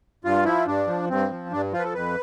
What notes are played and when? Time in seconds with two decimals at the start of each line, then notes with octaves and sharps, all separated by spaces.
0.24 G2 F4
0.45 F3 E4
0.66 G2 D4
0.88 F3
1.10 G2 C4
1.31 F3
1.52 G2 D4
1.73 F3 F4
1.79 B4
1.84 A4
1.94 F2 B4